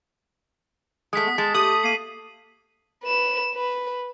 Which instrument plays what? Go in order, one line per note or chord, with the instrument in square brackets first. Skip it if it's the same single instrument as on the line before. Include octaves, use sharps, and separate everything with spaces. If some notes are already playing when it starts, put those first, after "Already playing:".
[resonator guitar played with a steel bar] G#3 A3 [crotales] D#6 B6
[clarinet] B3
[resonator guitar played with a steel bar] G#3 [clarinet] A5
[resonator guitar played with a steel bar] A3 [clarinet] G4 [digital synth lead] D#6 [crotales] F#7
[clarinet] A#3 [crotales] C7 D#7
[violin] B4 E7
B4